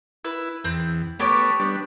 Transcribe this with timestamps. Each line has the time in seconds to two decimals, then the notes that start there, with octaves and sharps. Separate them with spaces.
0.25 E4 B4
0.64 E2 C4
1.19 A3 B3 G4 C#5 D6
1.60 G3 B3 D4